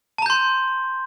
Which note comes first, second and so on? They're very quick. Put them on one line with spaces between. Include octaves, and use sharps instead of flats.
A5 A#5 G6 C6